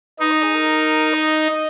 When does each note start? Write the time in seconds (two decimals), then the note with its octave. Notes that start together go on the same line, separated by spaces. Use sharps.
0.19 D#4 B4
0.32 D#5
0.43 G#4
0.55 A#4
1.14 D#5